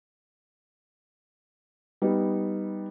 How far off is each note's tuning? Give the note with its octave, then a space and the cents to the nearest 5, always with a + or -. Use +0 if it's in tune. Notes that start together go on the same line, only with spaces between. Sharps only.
G3 +0 B3 +0 D#4 +0